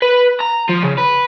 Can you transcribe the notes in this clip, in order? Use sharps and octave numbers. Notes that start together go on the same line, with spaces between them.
B4
A#5
F3
C#3
B4